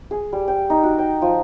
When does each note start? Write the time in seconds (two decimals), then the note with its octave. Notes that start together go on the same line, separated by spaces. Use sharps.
0.11 G#4
0.33 G3
0.48 G5
0.70 D#4
0.83 F#4
0.98 G5
1.22 F3